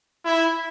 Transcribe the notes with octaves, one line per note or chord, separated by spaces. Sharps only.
E4